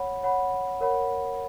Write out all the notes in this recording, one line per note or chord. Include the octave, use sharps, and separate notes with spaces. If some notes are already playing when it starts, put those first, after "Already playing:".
Already playing: C#5 F#5 B5
C#5 F#5 B5
A#4 C#5 F#5 B5